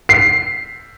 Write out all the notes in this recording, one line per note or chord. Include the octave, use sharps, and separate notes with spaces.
C7